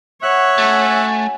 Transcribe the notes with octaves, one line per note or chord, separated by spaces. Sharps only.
C#5 E5 F#5 F#6
A3 C#4 F#4
G#5